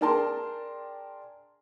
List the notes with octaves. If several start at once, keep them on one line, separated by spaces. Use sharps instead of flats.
D4 G#4 A#4 G5 A5 C6